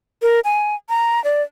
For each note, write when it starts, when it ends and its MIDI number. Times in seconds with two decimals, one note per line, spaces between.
0.22 0.40 70
0.44 0.75 80
0.89 1.22 82
1.24 1.42 74